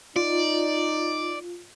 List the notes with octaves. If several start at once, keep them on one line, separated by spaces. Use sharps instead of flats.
D#4 F4 D5